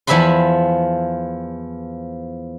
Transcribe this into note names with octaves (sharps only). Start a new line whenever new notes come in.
E2 F3 E5 G#5 B5 C6